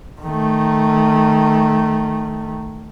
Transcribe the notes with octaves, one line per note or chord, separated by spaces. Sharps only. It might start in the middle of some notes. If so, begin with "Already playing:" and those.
D#3 A3